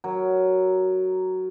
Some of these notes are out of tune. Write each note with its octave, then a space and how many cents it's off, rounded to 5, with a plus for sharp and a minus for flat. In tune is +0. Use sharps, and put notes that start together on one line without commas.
F#3 +10 A#4 +0